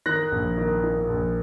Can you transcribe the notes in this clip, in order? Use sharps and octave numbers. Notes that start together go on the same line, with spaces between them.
D#3 F#6 A#6
A#1
D#3
D#3
A#1